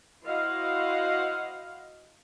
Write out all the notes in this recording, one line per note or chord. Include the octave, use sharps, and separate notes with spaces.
E4 F#4 C5 D#5 F5 F#5